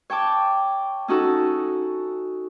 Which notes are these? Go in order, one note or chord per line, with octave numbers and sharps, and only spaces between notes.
C#5 G5 A5 D6
C#4 D#4 F#4 A4